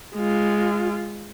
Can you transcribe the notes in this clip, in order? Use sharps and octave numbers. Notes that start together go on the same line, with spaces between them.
G#3 F4